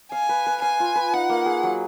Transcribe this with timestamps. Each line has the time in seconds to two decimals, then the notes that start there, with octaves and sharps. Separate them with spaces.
0.12 F5 G#5
0.29 B4
0.46 B4
0.62 F5 G#5
0.80 F4
0.96 B4
1.13 D#4 F#5
1.29 A#3
1.46 G#4
1.63 F#3